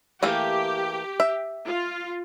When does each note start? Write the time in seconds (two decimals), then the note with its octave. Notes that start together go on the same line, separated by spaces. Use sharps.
0.23 E3 A3 A#3 G4
1.20 E5
1.66 F4